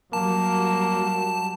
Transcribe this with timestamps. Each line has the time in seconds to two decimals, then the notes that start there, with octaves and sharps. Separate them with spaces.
0.13 F#3 G3 A#3 A5